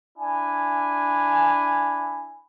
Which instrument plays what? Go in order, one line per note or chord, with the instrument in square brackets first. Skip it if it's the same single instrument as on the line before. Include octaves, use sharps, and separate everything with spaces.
[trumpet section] D4 E4 G#5